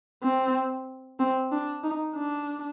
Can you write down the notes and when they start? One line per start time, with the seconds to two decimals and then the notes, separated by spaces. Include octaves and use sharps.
0.23 C4
1.20 C4
1.52 D4
1.84 D#4
2.16 D4